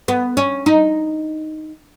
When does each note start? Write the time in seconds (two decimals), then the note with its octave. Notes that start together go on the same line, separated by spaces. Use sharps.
0.08 B3
0.37 C#4
0.66 D#4